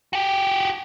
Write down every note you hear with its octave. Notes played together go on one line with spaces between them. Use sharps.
F#4 G4